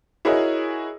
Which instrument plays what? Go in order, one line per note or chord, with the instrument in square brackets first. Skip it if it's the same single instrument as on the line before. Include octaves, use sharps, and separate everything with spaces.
[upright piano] E4 F#4 G#4 A#4 C#5 D#5